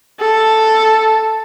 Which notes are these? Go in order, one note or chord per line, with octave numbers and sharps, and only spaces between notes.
A4